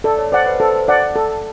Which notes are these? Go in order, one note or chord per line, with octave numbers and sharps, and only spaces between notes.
A4 D5
C#5
C5 D5 F#5
B4
A4 C5
D5 F#5
A4